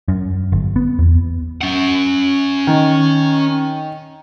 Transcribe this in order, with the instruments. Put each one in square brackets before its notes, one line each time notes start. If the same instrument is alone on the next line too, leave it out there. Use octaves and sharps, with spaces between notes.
[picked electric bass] F#2
G1
B3
E2
[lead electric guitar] C#4 F#5
[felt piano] D#3